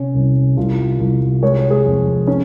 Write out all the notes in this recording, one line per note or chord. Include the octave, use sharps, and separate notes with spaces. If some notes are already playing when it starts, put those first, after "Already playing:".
Already playing: C3 C#4
C2
C2 F4
C2
G#3 C#5
G#4
F2
C#4